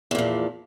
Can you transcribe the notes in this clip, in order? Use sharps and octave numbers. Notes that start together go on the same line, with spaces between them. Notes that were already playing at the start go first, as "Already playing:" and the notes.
E2 A#2 F3